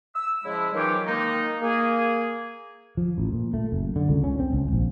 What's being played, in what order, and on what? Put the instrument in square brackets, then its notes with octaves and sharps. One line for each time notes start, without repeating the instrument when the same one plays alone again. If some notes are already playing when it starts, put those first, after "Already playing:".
[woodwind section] E6
C#3 F3 G#3 E4
D#3 E3 F#3 C#4 F4 G4
D#3 G#3 A#3 D#4
A#3 G#4
[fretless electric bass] F3
A1
A#2
A3
F#1
D3
C#2
C#4
C4
C#2
A#1